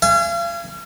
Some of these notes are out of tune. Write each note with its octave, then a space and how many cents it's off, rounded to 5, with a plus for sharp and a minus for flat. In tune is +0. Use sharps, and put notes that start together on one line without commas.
F5 -40 G#5 +0